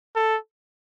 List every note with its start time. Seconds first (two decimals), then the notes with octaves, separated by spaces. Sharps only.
0.16 A4